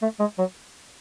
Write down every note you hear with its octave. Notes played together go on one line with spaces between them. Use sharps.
A3
G#3
F#3